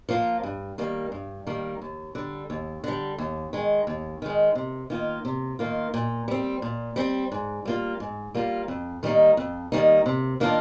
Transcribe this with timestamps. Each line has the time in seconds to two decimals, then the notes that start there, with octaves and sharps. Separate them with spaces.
0.09 F3 A#3 F4
0.43 G2
0.78 D#3 G3 A#3
1.12 G2
1.47 D#3 G3 A#3
1.82 D#2
2.15 D3 G3
2.50 D#2
2.84 D3 G3
3.18 D#2
3.53 D#3 G#3
3.87 D#2
4.22 D#3 G#3
4.55 C3
4.90 D#3 A#3 F4
5.25 C3
5.59 D#3 A#3 F4
5.94 A#2
6.28 G3 C4
6.62 A#2
6.96 G3 C4
7.32 G#2
7.65 G3 A#3 F4
8.00 G#2
8.34 G3 A#3 F4
8.68 F2
9.03 D#3 G3 A#3 D#4
9.37 F2
9.72 D#3 G3 A#3 D#4
10.06 C3
10.40 D#3 A#3 D4 F4